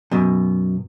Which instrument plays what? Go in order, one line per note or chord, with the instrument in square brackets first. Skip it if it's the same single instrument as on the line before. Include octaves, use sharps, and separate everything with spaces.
[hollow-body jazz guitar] F#2 B2